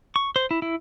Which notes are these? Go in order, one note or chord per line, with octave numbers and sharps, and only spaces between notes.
C#6
C5
E4
E4